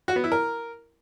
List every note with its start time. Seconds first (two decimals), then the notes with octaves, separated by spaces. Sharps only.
0.08 F#4
0.16 B3
0.24 E4
0.32 A#4